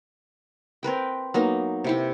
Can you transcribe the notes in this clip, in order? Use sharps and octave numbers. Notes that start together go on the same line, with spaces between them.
C4 A#4 B4 G5
F#3 A#3 B3 D#4
C3 E4 G4